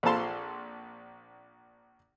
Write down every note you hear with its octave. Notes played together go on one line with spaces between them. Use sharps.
A#1 C4 F4 A4 A5 C6